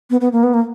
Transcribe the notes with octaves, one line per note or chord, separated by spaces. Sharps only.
B3
B3
A#3
B3
A#3